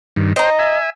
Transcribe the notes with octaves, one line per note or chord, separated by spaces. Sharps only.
G2 D#3
C5 D#5 G5 A#5
E5 G#5